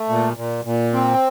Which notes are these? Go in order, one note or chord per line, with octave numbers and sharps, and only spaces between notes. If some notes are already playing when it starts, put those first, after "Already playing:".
Already playing: A3
A#2
A#2
A#2
C4